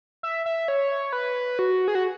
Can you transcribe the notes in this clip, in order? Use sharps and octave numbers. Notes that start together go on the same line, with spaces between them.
E5
E5
C#5
B4
F#4
G#4
F#4